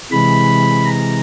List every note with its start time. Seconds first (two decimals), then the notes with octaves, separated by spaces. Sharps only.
0.12 C3 E3 G#3 B5
0.85 A#5